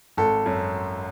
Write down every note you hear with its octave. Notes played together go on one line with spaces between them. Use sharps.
G#1 A4
F#2